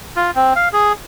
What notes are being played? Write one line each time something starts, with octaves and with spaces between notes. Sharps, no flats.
F4
C4
F5
G#4